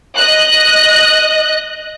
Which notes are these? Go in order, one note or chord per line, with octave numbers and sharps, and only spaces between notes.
D#5 F#6